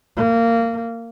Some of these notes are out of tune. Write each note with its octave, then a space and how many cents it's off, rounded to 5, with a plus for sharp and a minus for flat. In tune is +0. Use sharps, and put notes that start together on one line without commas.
A#3 -20